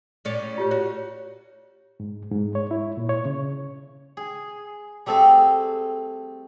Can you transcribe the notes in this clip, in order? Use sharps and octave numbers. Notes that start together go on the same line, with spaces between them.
A2 C#4 D5
F4 G4 C#5
F#4 C#5
G#2
G#2
C#5
E4
A#2
C#5
C#3
G#4
G3 A3 C4 G#4 A4